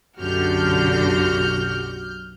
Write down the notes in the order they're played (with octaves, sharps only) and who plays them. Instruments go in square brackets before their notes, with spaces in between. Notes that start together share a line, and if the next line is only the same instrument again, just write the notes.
[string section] B1 F6 G6 [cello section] F#2 D3 [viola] F#4 G4